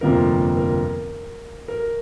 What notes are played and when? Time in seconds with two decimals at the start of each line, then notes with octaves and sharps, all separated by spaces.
0.01 G1 F2 C3 F3 A#3 A#4
0.57 A#4
1.68 A#4